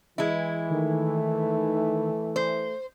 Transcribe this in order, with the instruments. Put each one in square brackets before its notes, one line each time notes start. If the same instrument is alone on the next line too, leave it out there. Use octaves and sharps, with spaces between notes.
[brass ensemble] E3 [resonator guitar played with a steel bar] G#3 E4
[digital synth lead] D#3 [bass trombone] A3
[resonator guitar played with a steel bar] C5